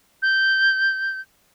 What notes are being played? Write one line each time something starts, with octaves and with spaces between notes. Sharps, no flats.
G6